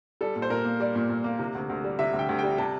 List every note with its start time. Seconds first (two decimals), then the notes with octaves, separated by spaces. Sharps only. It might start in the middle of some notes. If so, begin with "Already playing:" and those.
0.21 G3 A4
0.36 A#2
0.42 C5
0.50 A#2 A#4
0.65 A#3
0.80 G3 D5
0.95 A#2
1.09 A#2
1.24 A#3
1.39 C3
1.55 D2
1.69 D2
1.84 G3
1.99 C3 E5
2.13 D2
2.19 G5
2.29 D2
2.39 G3 G5
2.58 C3 A5